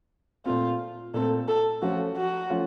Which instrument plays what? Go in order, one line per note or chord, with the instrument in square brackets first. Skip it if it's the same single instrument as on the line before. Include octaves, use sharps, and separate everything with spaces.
[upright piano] A#2 A3 C4 [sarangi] F4
[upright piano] A#2 A3 C4 [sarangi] A4
[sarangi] A4
[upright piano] F3 A3 C#4 F4 [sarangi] F#4
[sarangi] F#4
[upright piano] F3 A3 C#4 F4